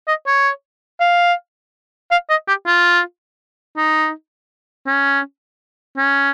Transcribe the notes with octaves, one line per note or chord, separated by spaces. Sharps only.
D#5
C#5
F5
F5
D#5
G4
F4
D#4
C#4
C#4